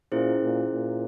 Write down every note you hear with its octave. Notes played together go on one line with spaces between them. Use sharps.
A#2 C#4 E4 G#4 C5
A#2
A#2